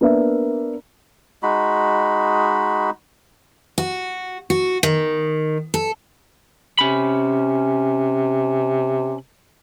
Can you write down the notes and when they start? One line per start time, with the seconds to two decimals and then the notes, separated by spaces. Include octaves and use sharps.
0.01 A#3 B3 D4 A#4 B4 E5
1.43 G#3 D#4 F#4 B5
3.78 F#4
4.50 F#4
4.83 D#3
5.74 A4
6.79 C3 C#4 B5